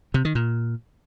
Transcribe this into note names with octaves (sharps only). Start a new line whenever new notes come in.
C3
D#3
A#2